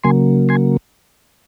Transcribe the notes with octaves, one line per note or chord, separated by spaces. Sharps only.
C#3 F#3 A#3 G#5 C6
G#5 C6